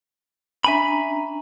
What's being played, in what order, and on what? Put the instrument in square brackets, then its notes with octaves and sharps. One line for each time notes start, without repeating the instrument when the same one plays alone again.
[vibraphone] C#4 D4 A#5 [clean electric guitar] E5 G#5 B5